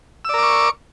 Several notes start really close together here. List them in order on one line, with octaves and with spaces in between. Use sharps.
E6 D5 A#4 D6 C#6